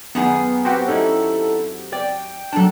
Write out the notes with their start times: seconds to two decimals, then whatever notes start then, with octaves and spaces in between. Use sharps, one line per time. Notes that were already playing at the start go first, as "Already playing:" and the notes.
0.15 F#2 D#3 B3 G#4
0.65 C4 F#4 G4
0.88 C#4 D#4 E4 A4
1.93 D5 G5
2.53 F#3 D4 A4 A5